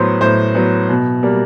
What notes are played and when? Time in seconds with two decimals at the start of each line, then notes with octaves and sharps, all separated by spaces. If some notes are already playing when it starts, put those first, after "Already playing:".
Already playing: A2 F#3 B3 B4 C5 C6
0.21 A2 C5 C6
0.55 F#3 B3
0.89 B2
1.23 G3 A#3